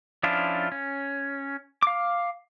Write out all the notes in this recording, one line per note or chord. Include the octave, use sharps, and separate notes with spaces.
F3 C#4 D4 E4 F4
C#4
F5 D6